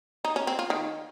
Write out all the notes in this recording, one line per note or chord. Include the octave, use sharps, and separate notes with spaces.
D#4
C#4
C4
F4
D#3